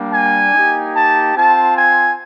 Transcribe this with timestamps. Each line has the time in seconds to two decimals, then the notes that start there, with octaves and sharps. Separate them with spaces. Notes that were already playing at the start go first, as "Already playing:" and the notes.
Already playing: G3 A#3 D4
0.13 G#5
0.54 A#3 D#4 G4
0.95 A5
1.35 C4 F4 A5
1.76 G#5